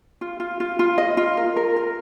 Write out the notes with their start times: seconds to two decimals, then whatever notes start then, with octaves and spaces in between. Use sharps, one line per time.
0.21 F4
0.40 F4
0.60 F4
0.79 F4
0.98 D#5
1.17 F4
1.37 A#4
1.57 A#4
1.76 A#4